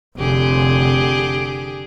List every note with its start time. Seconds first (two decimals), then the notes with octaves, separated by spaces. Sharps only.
0.18 F1 D3 G4 G#4